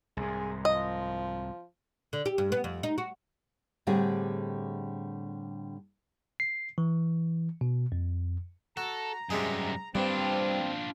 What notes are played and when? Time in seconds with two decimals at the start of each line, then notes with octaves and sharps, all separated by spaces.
0.17 C2 G#2 G#4
0.65 F3 D#5
2.13 D3
2.26 G4
2.38 G2
2.52 B3
2.64 F2
2.83 D#4
2.98 F#4
3.87 A2 D3 G3 A3 C4 G#4
6.40 C7
6.78 E3
7.61 B2
7.92 F2
8.77 F#4 A4 A#5
9.30 F#2 C3 G3 G#3 G#4
9.95 G2 G3 C4 D4 F4